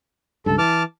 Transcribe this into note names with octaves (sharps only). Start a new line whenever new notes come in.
C#2 G2 A4
E3 A5 D6 F6